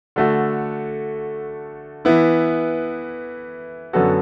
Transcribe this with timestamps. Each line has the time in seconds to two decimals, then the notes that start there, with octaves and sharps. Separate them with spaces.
0.16 D3 A3 F#4
2.05 E3 B3 E4
3.93 F#2 D3 B3 F#4 A4